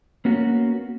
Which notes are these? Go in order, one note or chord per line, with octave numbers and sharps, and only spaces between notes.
A#3 B3 C#4 F#4 A#4